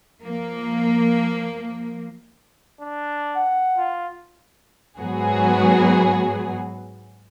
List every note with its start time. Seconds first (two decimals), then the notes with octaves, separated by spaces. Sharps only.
0.24 F3 A#3
2.80 D4
3.35 F#5
3.77 F4
4.99 G#2 F#3 B3 F#4 G#4